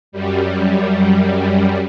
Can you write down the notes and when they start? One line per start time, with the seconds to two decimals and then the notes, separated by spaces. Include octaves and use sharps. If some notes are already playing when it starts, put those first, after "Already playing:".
0.12 F#2 G3